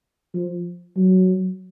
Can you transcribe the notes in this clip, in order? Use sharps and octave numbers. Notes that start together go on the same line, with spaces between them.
F3
F#3